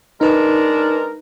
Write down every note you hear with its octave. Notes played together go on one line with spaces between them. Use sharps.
G#3 D4 D#4 A#4 B4